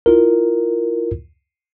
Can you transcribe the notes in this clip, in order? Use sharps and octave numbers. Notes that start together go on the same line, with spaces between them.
E4 F4 A#4